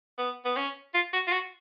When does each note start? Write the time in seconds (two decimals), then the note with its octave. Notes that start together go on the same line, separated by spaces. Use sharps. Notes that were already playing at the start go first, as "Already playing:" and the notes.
0.18 B3
0.45 B3
0.56 C#4
0.94 F4
1.13 F#4
1.27 F4
1.32 F#4